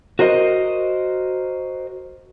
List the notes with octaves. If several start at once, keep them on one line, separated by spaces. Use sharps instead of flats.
F#4 A#4 C5 D#5